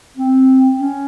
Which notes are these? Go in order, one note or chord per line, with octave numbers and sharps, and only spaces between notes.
C4
C#4